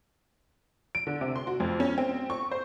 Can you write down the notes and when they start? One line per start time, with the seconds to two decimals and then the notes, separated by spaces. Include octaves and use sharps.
0.95 D7
1.07 D3
1.21 C3
1.36 C6
1.47 F#4
1.60 F2
1.80 C#4
1.98 C4
2.30 C#6
2.51 C5